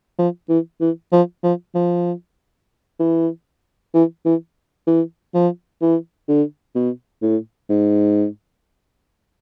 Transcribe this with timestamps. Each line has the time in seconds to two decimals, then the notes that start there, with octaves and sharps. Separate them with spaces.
0.19 F3
0.49 E3
0.81 E3
1.12 F3
1.43 F3
1.75 F3
2.99 E3
3.94 E3
4.25 E3
4.87 E3
5.34 F3
5.82 E3
6.28 D3
6.75 B2
7.22 A2
7.69 G#2